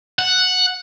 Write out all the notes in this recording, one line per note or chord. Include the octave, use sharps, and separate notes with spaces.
F#5